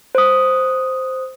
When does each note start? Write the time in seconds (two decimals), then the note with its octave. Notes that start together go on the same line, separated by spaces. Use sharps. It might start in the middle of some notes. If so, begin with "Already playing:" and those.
0.15 C5 D#6